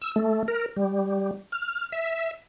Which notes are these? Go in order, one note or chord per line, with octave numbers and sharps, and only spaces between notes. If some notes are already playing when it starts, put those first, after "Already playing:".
E6
A3
A#4
G3
F6
E5